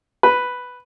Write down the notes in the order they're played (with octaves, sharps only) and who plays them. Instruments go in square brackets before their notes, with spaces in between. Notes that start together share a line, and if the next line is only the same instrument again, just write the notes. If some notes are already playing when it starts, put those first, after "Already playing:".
[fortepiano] B4